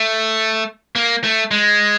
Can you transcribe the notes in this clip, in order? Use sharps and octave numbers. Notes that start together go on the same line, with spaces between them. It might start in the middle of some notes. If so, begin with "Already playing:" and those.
Already playing: A3
A#3
A3
G#3